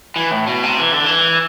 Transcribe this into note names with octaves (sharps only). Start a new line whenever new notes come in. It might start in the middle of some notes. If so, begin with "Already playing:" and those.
E3
A2
B2
C3
E3
D3
E3